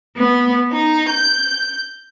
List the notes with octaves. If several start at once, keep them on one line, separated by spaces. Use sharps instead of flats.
B3
D#4
G6